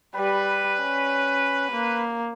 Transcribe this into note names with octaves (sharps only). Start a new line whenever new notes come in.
G3 B4
C#4
A#3